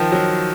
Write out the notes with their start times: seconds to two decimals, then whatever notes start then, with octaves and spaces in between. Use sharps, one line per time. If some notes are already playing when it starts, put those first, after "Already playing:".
Already playing: D#3 F3
0.12 F#3